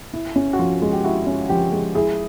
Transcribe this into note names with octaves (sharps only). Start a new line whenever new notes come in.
E4
C#4
F#4
F3 F4
G#3
G4
E4 F#4
C#4
F3 G4
G#3
E4 G#4